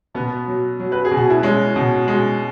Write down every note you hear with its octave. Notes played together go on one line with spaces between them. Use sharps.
B2 B3
F#3
F#3
B4
G#4
B2
F#4
E4
G#3 C#4
B2
G#3